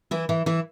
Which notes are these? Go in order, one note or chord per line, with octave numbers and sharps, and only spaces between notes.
E3 E4
E3 E4
E3 E4